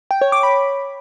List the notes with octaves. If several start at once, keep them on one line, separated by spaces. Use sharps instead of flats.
G5
C#5
D6
B5